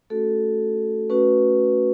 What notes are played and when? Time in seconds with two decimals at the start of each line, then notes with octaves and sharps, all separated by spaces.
0.10 A3 C#4 F#4 A4
1.09 A3 C#4 F#4 B4